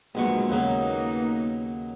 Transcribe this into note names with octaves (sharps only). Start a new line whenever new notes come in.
A#1 B2 F#3 G#3 C#6
D#2 C#3 F#3 A#3 B3 D#4